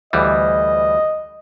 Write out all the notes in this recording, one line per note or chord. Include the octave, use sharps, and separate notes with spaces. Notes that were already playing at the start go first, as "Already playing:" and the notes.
D2 E3 G3 D#5